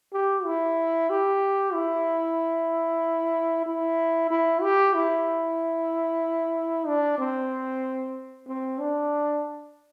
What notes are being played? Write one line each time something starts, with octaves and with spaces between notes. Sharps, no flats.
G4
E4
G4
E4
E4
E4
G4
E4
D4
C4
C4
D4